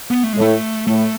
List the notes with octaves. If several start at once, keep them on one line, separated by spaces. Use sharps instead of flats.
B3
A3
G#3
A2 A3
A2 A3